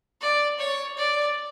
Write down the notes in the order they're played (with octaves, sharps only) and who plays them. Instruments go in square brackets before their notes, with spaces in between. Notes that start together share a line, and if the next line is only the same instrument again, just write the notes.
[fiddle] D5
C#5
D5